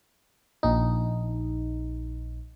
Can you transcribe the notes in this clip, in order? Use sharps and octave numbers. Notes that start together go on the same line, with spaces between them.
A#1 D#4